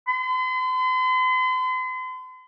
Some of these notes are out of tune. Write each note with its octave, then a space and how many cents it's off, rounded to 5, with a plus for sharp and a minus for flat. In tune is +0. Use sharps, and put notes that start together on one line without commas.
C6 -45